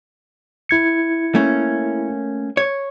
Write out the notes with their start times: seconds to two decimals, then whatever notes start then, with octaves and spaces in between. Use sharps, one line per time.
0.69 E4 G#6 C#7
1.35 A3 A#3 C#4
2.57 C#5